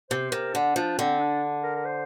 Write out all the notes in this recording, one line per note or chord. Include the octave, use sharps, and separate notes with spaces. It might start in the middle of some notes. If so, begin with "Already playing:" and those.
C3 C5
C3 A#4
D3 D4
F3 D4
D3 C4
D4
A#4
A#4
C5